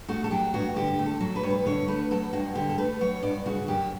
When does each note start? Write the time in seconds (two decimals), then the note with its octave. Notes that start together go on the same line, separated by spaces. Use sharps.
0.08 A3 F#4
0.24 A4
0.31 F#3 G4
0.54 G2 F#4
0.76 D3 G4
0.99 A3
1.06 A4
1.20 F#3
1.36 B4
1.43 G2 C#5
1.50 B4
1.66 D3 C#5
1.88 A3 B4
2.11 F#3 A4
2.33 G2 F#4
2.55 D3 G4
2.69 A4
2.78 A3 B4
3.01 F#3 C#5
3.23 G2 D5
3.46 C#3 F#4
3.68 F#2 G4